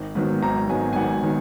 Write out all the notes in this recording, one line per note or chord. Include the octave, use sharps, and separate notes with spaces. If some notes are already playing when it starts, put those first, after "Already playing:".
Already playing: G#1
G#2 D#3 F#3 B3
G#1 A#5
G#2 D#3 F#3 B3 G#5
G#5
G#1 F#5
D#3 F#3 B3